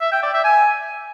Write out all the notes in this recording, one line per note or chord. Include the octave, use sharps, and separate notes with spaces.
E5
G5
D5
E5
G#5